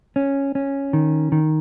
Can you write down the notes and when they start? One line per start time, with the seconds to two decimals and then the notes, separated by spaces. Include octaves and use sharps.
0.16 C#4
0.55 C#4
0.93 D#3
1.32 D#3